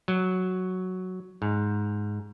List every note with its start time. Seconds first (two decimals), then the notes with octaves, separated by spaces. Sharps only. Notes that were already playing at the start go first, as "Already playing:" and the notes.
0.08 F#3
1.42 G#2